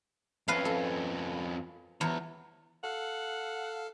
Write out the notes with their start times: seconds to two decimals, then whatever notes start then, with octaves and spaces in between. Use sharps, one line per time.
0.48 F2 C#4 B4 F5 A5
0.65 A4
2.01 E2 D4 A#5
2.84 A4 F5 F#5